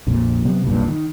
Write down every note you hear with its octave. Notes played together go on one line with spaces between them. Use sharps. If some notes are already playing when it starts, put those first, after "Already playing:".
A#1 F2 A#2
C3 F#3 B3
F1 B1 G2 A#2
D#3